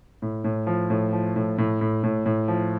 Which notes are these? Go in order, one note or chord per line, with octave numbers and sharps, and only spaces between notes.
A2
A2
F3
A2
F3
A2
A2
A2
A2
A2
F3